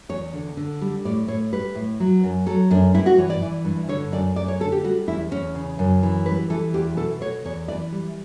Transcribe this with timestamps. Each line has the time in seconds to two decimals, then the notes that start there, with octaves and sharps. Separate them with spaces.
0.09 E2 C#5
0.33 D3
0.57 D3
0.81 G3
1.05 A2 D5
1.28 A2 C#5
1.52 G3 B4
1.75 A2
2.00 F#3
2.23 F#2
2.46 F#3 A4
2.71 F#2 D4
2.94 G2 E4
3.06 F#4
3.18 E3 C#5
3.30 D5
3.42 E3
3.65 G2
3.89 D3 C#5
4.12 F#2 D5
4.36 F#2 D5
4.48 C#5
4.60 D3 A4
4.72 G4
4.84 G3 F#4
5.07 E2 E4
5.31 E2 C#4
5.55 C#3
5.79 F#2
6.03 E3
6.26 G3 B4
6.50 E3 A4
6.74 E2 G4
6.97 B2 A4
7.21 B2 C#5
7.45 E2 C#5
7.68 E3 D5
7.92 G3